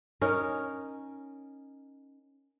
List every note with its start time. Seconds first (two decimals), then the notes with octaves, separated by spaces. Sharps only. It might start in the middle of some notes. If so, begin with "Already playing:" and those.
0.21 C#4 D#4 A#4